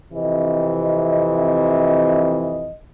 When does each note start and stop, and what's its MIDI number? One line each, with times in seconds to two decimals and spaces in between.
0.14 2.75 41
0.14 2.75 48
0.14 2.75 52
0.14 2.75 75